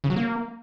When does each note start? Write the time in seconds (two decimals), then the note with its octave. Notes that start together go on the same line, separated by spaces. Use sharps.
0.04 C#3
0.10 F#3
0.16 A#3